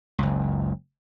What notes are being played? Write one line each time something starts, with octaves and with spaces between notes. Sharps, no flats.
F#1 C#2